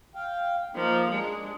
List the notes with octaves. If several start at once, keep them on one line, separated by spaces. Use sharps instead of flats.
F5 G5
F3 A#3 D#4
G#3 D4